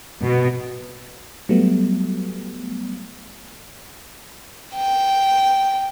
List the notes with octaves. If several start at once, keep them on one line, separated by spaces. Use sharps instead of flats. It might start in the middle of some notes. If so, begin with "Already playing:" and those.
B2
F#3 G3 A3 B3
G5